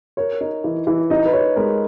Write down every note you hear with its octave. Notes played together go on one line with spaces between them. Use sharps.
A#4 C#5
D#4
E3
E3
D#4 D#5
B4
D#4 C#5
G#3 A#4